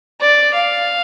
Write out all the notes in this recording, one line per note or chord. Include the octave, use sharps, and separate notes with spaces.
D5
F5